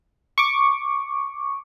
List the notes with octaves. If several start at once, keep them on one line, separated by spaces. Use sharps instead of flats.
C#6 D6